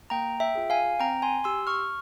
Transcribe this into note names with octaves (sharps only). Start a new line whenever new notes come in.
A#3 G5 A#5
E5 G5
F4 G#4
F5 G#5
C4 G5 A#5
G#5 C6
G4 C6 E6
C#6 F6